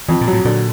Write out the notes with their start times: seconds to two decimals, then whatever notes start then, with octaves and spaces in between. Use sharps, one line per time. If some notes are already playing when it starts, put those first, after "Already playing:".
0.08 F2 E3
0.21 A#2
0.27 F#3
0.33 A2
0.45 A#2 D3